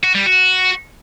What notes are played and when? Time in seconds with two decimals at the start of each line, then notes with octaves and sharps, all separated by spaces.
0.04 F#4
0.15 G3
0.26 F#4